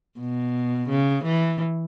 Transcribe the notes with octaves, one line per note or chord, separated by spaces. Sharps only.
B2
C#3
E3